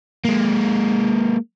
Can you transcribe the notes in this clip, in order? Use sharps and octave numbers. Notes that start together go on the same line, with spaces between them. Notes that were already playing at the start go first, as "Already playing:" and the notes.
G#3 A#3